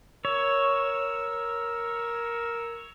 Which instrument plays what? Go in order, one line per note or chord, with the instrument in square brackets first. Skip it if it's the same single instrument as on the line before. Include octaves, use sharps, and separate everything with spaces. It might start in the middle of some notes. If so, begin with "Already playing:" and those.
[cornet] A#4 [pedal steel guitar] C#5 [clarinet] E6